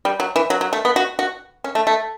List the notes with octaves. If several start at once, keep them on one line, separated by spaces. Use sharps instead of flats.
G3
F#3
E3
F#3
F#3
A3
B3
F#4
F#4
C#4
A3
A3